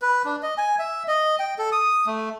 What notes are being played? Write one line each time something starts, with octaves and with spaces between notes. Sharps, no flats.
B4
D4
D#5
G#5
E5
D#5
G5
A4
D#6
A3